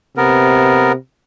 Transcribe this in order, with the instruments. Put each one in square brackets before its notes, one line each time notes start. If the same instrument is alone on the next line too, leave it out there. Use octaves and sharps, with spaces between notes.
[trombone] C3 [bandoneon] B3 A#4